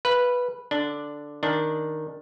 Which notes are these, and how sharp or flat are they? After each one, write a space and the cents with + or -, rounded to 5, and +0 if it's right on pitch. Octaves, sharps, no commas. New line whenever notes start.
B4 -5 F5 -30
D3 +0 D4 +0
D#3 +0 D4 +0